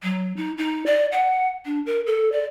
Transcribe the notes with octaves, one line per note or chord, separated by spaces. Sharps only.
F#3
D#4
D#4
D5
F#5
D4
A#4
A4
D5